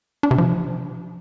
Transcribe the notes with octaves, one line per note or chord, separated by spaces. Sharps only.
D4
C3
F3